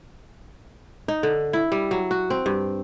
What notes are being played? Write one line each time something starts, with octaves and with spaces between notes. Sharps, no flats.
D#4
D3
E4
G3
F#3
F#4
C4
G2